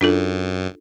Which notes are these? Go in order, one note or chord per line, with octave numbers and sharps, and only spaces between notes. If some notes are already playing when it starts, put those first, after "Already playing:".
F#2 D4 F4 A4